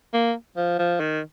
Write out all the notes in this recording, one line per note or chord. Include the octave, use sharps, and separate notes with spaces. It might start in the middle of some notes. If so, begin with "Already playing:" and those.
A#3
F3
F3
D#3